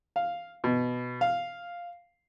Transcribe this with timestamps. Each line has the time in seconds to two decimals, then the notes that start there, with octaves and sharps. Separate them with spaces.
0.16 F5
0.64 B2
1.21 F5